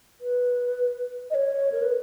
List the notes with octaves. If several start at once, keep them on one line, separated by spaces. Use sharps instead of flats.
B4
D#5
C#5
A#4
B4